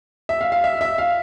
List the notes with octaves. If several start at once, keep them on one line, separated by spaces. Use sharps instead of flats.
E5
F5
F5
E5
E5
F5